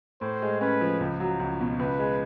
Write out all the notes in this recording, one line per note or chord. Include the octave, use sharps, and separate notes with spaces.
A2 C5
G#3
C#4 B4
F3
C#2
F#3
C#2
B2
C#2 B4
G#3